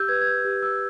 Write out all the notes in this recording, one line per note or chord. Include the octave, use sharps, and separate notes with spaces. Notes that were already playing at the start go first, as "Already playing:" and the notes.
Already playing: G4 E6 G6
B4 G#6
G#6
G6
G4
E6